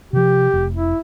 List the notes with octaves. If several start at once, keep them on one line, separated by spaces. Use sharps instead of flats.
C3 F3 G4
F1
E4